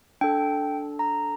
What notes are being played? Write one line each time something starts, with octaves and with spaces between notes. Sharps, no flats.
D4 A4 G5
A#5